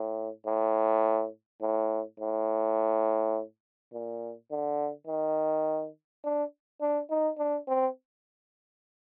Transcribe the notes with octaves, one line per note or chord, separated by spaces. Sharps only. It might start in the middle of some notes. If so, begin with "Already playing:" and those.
Already playing: A2
A2
A2
A2
A#2
D3
D#3
D4
D4
D#4
D4
C4